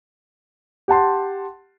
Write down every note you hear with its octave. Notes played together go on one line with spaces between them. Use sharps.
G4 F#5 A5 C6